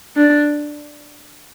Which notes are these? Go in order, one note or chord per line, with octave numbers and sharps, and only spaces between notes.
D4